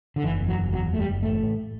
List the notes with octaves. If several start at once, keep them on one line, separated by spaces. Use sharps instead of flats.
D3
F#1 E3
E2
F#3
F#1
E2 F#3
F#1 A3
G3
F#1
A1 A3
A1